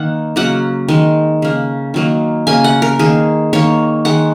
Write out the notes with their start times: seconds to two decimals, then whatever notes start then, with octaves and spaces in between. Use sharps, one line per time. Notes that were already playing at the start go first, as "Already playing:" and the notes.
Already playing: D#3 A#3 F#5
0.36 C#3 F#3 A#3 F#5
0.88 D#3 G#3
1.42 C#3 A#3
1.94 D#3 F#3 A#3
2.47 C#3 A#3 G#5
2.64 F#5
2.82 A#4
2.99 D#3 A#3 G#4
3.53 D#3 A#3 C#5
4.05 D#3 G#3 F#5